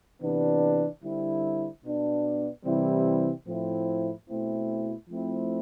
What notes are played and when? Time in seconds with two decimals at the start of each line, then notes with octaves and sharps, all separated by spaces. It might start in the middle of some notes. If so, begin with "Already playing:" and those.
0.21 C3 E3 B3 D4
1.03 D3 G3 C4 E4
1.84 B2 B3 D4
2.65 C3 E3 G3 C4 E4
3.47 A2 F3 C4 E4
4.29 B2 A3 C4 E4
5.09 F3 A3 C4 E4